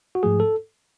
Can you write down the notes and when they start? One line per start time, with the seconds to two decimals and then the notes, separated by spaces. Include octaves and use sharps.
0.15 F#4
0.23 G#2 F3 A3 G#4
0.40 A4